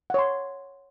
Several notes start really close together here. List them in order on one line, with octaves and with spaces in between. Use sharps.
F#5 C#5 C6